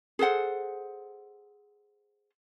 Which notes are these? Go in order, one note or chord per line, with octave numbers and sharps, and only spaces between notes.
G#4 A4 C5 F#5